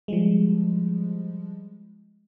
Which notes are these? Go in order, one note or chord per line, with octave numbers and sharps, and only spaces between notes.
F3 G3 G#3